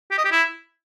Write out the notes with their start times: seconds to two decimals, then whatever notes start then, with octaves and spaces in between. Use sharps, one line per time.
0.11 G4
0.18 D#5
0.25 G4
0.32 E4